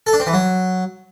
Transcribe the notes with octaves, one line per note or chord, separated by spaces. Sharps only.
A4
D4
C4
E3
F#3